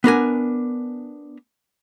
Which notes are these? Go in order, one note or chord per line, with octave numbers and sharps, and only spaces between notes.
B3 D4 A#4 G#5